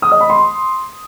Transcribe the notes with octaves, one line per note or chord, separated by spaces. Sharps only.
D#6
D#5
B5
C6